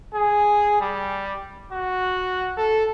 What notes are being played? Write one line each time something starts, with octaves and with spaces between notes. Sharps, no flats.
G#4
G3
F#4
A4